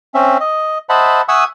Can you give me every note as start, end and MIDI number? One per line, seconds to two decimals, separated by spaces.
0.14 0.38 60
0.14 0.38 61
0.14 0.38 76
0.40 0.78 75
0.89 1.22 72
0.89 1.22 75
0.89 1.22 76
0.89 1.22 78
0.89 1.22 81
0.89 1.22 83
1.28 1.44 76
1.28 1.44 78
1.28 1.44 80
1.28 1.44 85
1.28 1.44 87
1.28 1.44 88